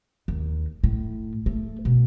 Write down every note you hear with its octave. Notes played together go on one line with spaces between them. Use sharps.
D#2
A2
A3
B2